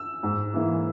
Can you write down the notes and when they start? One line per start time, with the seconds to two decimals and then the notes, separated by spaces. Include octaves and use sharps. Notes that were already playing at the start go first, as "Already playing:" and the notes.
Already playing: E6
0.23 G#2
0.54 E3 A#3 E4